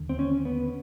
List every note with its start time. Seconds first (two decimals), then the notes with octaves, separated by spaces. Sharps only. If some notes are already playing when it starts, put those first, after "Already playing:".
Already playing: D#2 D3
0.09 C4
0.19 C#4
0.45 B3